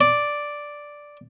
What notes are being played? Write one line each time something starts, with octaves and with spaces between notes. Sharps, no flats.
D5